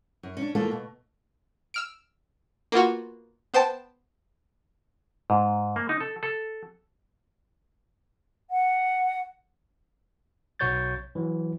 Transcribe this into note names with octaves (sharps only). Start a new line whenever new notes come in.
F#2
C#4 D4
E2 A3 A#3 F4 A4
B2
E6 F6 D7
A#3 B3 F4 F#4
B3 C5 G5 A5
G#2
A#3
D#4
A4
A4
F#5
B1 B2 F#4 C#5 G6 A6
E3 F#3